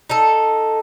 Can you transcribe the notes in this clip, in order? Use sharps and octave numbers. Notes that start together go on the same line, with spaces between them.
D#4 A4